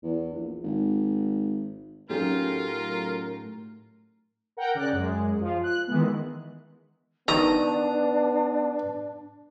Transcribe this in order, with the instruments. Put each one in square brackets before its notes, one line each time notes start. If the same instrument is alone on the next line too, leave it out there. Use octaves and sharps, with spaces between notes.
[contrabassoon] E2
A#1
G#1
[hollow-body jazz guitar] A2 D#4 G4 [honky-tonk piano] F#3 A3 C#4 [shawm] F4 [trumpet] A#4
[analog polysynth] A#4 F#5 G5 A#5
C#3 D5 F#6
F#2 G#3
F3 F4
F#6
D#3 E3 G#3 B3
[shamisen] D#3 [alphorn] B3 [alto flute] D4 [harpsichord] A#5 D#6